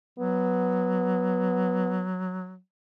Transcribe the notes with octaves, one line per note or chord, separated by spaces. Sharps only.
F#3 B3